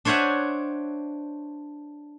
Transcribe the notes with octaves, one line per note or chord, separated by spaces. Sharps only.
D4 C5 C#5 E5 F#5 G#5